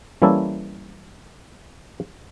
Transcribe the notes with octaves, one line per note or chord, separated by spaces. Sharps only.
E3 G3 A#3 C#4 E4 A4